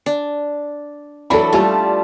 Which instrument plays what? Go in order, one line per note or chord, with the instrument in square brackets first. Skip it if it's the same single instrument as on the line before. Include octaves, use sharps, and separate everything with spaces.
[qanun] D4
[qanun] E3 F#3 D4 [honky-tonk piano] A4 B5
[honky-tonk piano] G3 A5 [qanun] A3 F4